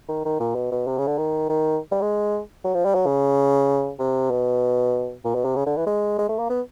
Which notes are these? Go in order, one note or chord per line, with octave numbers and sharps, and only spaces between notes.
D#3
D#3
A#2
B2
B2
C3
C#3
D3
D#3
D#3
G3
G#3
F#3
F3
G3
F#3
C#3
C3
B2
A#2
B2
C3
C#3
D3
E3
G#3
G#3
A3
A#3
B3